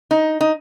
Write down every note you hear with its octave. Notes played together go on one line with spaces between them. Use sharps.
D#4
D#4